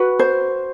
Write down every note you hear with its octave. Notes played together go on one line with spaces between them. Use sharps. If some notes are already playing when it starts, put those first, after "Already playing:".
Already playing: F#4 B4
C5